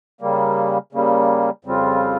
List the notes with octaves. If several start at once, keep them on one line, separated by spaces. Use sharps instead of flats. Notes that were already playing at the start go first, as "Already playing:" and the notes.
C#3 G3 A#3
C#3 G3 A#3
F2 C#3 G3 C4 F4